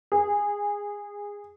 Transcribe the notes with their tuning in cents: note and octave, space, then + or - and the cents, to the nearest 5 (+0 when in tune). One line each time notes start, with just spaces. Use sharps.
G#4 -15